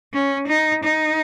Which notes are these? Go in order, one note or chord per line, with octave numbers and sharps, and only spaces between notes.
C#4
D#4
D#4